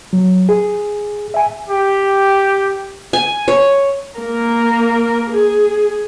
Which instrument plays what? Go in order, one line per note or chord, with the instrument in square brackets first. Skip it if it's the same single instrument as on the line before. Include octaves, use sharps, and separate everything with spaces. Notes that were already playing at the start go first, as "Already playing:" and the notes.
[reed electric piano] F#3
G#4
E5 G#5
[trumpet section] G4
[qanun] G#5
C#5
[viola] A#3 A#4
G#4